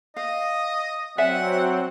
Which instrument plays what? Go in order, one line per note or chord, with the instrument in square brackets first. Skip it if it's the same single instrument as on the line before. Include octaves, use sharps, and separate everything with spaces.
[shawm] D#5 [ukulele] F5
[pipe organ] F#3 C4 [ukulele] D5 E5 G#5 [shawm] F#5